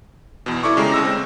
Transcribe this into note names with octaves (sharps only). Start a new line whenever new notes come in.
E2 B2
E4 A4 D5 C#6 D6
C#3 G#3 G4 A#5
C#2 E6 A#6
C4